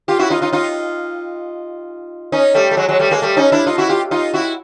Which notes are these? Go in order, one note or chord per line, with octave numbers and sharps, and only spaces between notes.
F4 G4
E4 F#4
D#4 F4
D#4 F4
D#4 F4
C#4 D#4
G3 A3
A3
F#3 G#3
F#3 G#3
G3 A3
G#3 A#3
G3 A3
C#4 D#4
D4 E4
D#4 F4
E4 F#4
F4 G4
D#4 F4
E4 F#4